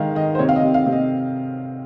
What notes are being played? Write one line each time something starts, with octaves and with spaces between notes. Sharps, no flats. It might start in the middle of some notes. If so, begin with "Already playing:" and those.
Already playing: D#3 G#3 F5
D#3 D#5
C5
C3 C#5
F5
D#5
C3
F5
C3
D#5